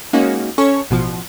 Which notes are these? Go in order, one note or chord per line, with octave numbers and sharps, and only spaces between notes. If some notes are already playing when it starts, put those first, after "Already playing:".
G#3 A#3 C#4 D#4 F#4
C#4 A4 C#5 C#6
A1 B2 F3